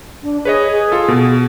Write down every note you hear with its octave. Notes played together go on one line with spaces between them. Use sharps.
D4
G#4 B4 C#5 D#5
G#4
F4 A4
B2